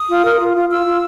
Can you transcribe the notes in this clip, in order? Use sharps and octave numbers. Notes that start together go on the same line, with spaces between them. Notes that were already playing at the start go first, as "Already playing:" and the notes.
Already playing: D#6
F4
A#4
F4
F4
F4 E6
F4